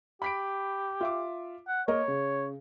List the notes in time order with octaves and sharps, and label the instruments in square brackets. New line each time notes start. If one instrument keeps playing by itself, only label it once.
[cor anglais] G4 [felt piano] B5 B6 D7
[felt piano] F4 E5 D6
[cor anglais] F#5
[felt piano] A#3 A#4 D#5 [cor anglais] C#5
[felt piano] C#3